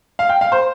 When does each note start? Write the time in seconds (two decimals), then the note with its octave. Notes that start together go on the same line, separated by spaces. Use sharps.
0.19 F5
0.29 G5
0.41 F5
0.52 C5